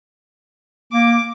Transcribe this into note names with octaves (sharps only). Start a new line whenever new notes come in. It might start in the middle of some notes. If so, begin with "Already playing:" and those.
A#3 D6